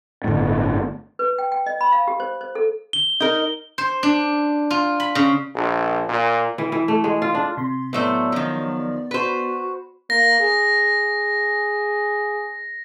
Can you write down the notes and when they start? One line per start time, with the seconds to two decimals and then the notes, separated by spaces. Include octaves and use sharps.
0.24 G1 A2
1.19 B4
1.38 G5
1.52 G5
1.66 D#5
1.81 B5
1.92 F5
2.08 G4
2.20 C5
2.41 C5
2.55 A4
2.93 G7
3.20 D#4 A#4
3.78 C5
4.03 D4
4.71 F4
5.00 B5
5.15 C#3
5.55 A#1
6.09 A#2
6.58 E3
6.72 E3
6.88 A3
7.04 G#3
7.22 F4
7.35 D4
7.57 C3 C6
7.93 A2 F#3 A3 B3 C5 D5
8.32 D#3 F3
9.11 F#4 B4 C5
10.10 A#3 A#6
10.40 G#4